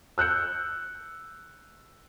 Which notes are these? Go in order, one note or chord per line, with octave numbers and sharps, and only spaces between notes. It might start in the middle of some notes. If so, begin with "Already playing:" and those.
E6 F#6 G6 C#7